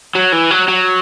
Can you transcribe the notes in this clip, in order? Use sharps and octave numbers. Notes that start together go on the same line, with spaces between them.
F#3
E3
F#3
F#3